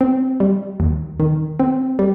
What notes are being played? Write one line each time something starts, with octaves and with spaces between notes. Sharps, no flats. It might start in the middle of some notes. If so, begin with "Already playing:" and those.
C4
G3
D#2
D#3
C4
G3